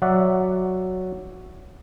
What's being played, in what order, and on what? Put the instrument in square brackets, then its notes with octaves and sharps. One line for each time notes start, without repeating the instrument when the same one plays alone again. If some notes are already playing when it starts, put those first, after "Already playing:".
[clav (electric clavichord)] F#3 F#4 D5 E5 F#5